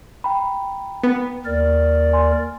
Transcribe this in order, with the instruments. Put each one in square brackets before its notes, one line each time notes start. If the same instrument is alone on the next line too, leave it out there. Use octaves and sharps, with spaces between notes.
[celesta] G5 A#5 B5
[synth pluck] B3
[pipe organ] D#2 A#4 D5
[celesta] G#5 C6